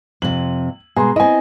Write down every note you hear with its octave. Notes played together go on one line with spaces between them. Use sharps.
F2 C3 F#7
B2 G#3 G#4 A#5 C6
C4 E4 D#5 G#5